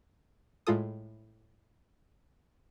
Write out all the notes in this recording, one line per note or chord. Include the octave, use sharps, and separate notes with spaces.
A2 G#3 F4 A4 D#6